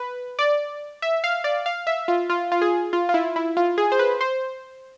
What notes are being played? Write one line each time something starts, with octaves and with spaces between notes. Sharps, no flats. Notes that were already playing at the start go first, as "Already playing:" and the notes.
Already playing: B4
D5
E5
F5
D5
F5
E5
F4
F4
F4
G#4
F4
F4
E4
E4
F4
G#4
C5
B4
C5